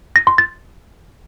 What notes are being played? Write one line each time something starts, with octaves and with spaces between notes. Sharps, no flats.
A#6
C6
A6